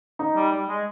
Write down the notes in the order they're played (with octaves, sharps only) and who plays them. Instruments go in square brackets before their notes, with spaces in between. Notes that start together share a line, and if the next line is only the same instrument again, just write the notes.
[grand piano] D#4
[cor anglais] G3
G3
G#3